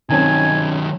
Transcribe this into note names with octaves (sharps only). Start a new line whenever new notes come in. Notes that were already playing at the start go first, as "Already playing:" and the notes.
D#3 F#3 C4 C#4 D#4 G#5 A5